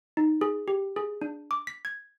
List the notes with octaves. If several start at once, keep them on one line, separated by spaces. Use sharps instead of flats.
D#4
G#4
G4
G#4
D4
D6
B6
G#6